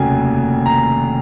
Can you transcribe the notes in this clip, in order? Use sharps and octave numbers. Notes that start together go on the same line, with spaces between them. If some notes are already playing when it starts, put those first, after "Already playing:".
Already playing: F1 D#2 C#3 F#3 G#5
A#5